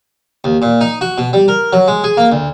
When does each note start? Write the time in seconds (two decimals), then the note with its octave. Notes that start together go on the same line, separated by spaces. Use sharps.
0.44 D#2
0.62 A#2
0.81 D#4
1.01 F#4
1.18 B2
1.33 G3
1.48 A#4
1.73 F#3
1.88 G#3
2.04 G#4
2.17 A#3
2.32 D2